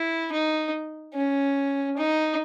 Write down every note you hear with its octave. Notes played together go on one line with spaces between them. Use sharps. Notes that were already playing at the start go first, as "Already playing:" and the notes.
Already playing: E4
D#4
C#4
D#4